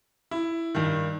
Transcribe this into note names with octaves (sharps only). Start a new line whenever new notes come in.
E4
G2 D#3